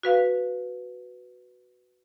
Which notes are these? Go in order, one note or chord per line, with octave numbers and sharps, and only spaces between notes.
F#4 B4 F5